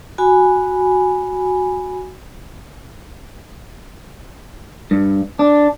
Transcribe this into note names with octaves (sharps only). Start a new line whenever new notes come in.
F#4 G#5 B5
G2
D4